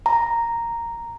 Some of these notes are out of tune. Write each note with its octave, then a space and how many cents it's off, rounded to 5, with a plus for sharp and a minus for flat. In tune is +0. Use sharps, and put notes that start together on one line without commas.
A#5 -5